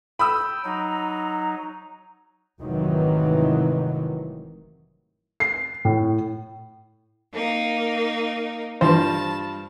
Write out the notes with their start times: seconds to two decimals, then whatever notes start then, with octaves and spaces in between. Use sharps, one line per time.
0.19 G5 B5 D#6 E6
0.65 F#3 D#4 A#5
2.61 F1 G#2 C3 D#3 E3 F#3
5.40 C7
5.85 A2
7.34 A#3 D#4
8.81 G2 E3 F3 C5 A5